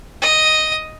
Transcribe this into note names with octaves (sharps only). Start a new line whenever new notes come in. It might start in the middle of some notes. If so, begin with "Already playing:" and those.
D#5